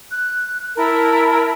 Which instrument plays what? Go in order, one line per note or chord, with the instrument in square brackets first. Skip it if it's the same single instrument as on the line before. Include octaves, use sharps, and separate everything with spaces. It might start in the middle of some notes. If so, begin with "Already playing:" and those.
[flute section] F#6
E4 A#4 A5 B5